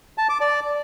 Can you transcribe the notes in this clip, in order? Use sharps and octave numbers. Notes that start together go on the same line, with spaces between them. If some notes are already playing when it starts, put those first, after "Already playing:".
A5
D6
D5